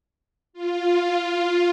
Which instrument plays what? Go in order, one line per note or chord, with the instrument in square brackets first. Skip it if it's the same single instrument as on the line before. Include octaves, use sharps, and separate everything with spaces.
[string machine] F4